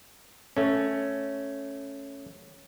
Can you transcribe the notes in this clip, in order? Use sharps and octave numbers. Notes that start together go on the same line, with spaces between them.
A3 C#4